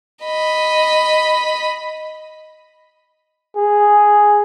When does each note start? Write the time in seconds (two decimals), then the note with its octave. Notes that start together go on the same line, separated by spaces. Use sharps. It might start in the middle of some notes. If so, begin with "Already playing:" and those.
0.23 D#5 B5
3.56 G#4